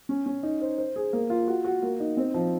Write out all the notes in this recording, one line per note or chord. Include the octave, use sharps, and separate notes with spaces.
C#4
C#4
D#4
C5
C5
G#4
A#3
F4
F#4
F#4
A#3
D#4
C4
F3